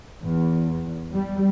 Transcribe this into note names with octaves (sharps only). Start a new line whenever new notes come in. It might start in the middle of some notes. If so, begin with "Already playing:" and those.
E2
G3